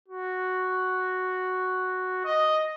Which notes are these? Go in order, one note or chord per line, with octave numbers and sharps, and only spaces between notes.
F#4
D#5